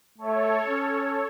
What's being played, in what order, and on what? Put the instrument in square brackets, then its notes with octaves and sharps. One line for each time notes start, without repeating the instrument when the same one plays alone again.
[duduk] A3 [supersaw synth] A4 C#5
[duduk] C#4